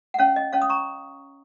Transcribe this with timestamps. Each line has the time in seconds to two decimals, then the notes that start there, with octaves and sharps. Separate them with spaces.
0.14 F#5
0.19 C#4 C#5 F5
0.36 D#5
0.53 C#4 C#5 F5
0.62 D#6
0.69 A#5 C#6